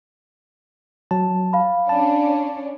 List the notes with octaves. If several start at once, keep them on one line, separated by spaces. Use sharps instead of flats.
F#3 A5
F5 B5
C#4 D4 A5